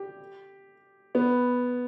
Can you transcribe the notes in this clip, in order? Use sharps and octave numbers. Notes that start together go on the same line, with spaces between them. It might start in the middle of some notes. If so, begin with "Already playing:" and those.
Already playing: G4
B3